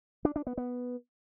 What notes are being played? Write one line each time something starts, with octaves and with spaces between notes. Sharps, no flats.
D4
D4
B3
B3